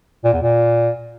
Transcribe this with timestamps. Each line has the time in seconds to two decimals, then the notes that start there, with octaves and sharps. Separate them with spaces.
0.24 A#2
0.33 E2
0.42 A#2